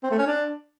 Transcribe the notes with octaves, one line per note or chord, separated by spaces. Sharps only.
C4
A3
C#4
D4